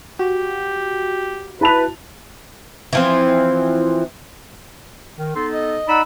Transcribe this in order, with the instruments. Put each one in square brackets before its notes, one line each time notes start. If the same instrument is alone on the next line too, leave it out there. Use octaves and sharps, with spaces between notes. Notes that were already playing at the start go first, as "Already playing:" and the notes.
[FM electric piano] F#4 [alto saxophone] G4
[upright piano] E4 A5 F7 [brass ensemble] B4
[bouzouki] E3 F3 C4
[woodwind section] D#3
[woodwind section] B3 D#4 A4 [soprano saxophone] C6
[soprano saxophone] D#5
[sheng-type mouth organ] D#4 B5 [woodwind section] D5 F#5 E6